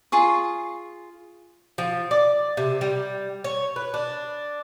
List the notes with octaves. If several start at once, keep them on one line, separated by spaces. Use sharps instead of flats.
F4 G#4 C#6
F3
D5
C3
G3
C#5
B4
D4